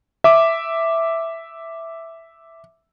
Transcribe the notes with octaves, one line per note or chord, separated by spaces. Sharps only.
E5 D6